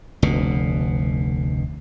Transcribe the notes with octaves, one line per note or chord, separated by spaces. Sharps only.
F1 D2 B2